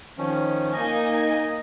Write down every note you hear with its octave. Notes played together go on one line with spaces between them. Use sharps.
D#3 F3 C#4
A#3 D#4 D#5 G#5